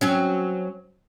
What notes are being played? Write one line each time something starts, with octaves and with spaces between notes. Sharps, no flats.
F#3 C4 C#4